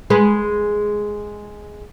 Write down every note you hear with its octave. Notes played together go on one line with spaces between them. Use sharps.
G#3 G#4 B4